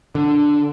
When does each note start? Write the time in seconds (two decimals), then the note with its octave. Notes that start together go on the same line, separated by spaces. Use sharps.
0.15 D3